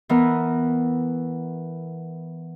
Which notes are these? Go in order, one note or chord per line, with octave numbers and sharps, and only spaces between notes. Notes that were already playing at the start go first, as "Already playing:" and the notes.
E3 B3 A#4